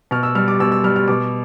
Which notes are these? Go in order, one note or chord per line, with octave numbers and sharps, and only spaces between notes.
B2 F6
E6
G3 F6
D6
B2 E6
E6
G3 F6
F6
B2 D6